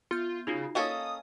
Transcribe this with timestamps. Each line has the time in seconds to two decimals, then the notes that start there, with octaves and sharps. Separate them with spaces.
0.11 B3 F4 G6
0.47 C#3 D#4 F4 F#4
0.75 A#3 C#4 A4 D#5 F5 D#6